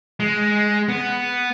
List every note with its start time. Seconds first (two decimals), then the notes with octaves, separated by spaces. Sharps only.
0.20 G#3
0.89 B3